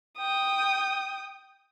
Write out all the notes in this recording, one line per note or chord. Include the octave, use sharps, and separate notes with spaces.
G5 D#6